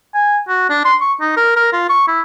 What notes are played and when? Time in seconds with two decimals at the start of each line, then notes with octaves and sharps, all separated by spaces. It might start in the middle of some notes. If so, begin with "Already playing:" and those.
0.14 G#5
0.48 F#4
0.70 D4
0.85 C6
1.01 C#6
1.21 D#4
1.36 A#4
1.56 A#4
1.73 F4
1.90 C#6
2.08 E4